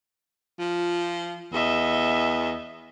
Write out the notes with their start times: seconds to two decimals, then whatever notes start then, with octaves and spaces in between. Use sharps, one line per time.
0.59 F3
1.53 E2 D#5 E5